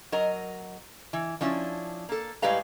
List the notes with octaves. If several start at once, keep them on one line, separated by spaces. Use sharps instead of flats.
F#3 A#4 D#5 A#5
E3
F3 C#4 D4 E4
A#3 A4
A2 G3 G#3 B4 F5 A#5